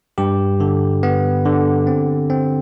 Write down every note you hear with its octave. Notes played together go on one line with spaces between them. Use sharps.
G2 G4
D3
B3
D3
C4
C4